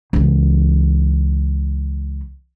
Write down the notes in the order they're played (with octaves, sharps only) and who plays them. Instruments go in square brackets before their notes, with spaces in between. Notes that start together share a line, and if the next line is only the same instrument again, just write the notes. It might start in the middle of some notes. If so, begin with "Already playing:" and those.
[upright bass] C#2 E3